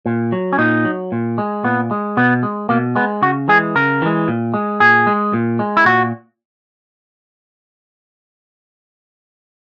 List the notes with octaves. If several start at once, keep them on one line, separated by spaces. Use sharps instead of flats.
A#2
F#3
C#4
A#2 D#4
F#3
A#2
G#3
A#2 B3
G#3
B2 B3
G#3
B2 A#3
G#3 B3
C#3 F#4
E3 G#3 G#4
C#3 A#4
E3 G#3
A#2
G#3
A#2 G#4
G#3
A#2
G#3
E4
A#2 F#4